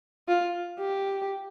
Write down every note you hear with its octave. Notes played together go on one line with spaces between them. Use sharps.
F4
G4